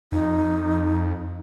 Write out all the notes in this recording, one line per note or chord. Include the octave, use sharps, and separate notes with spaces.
F2 D#4